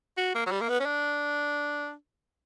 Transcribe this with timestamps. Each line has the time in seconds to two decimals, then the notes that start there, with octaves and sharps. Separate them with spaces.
0.17 F#4
0.35 A#3
0.46 F#3
0.51 G3
0.61 A#3
0.69 B3
0.80 C#4
0.85 D4